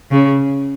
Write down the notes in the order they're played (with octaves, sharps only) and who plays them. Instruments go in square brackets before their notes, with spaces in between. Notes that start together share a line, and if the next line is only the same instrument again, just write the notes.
[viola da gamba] C#3